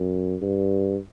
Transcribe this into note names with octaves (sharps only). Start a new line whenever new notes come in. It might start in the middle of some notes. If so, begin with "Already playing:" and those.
Already playing: F#2
G2